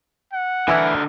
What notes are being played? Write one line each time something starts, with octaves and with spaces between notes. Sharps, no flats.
F#5
D3 E3 E4 A#4